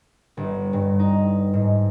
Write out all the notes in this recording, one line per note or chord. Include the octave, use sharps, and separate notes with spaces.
G1
G2
D#4
G#2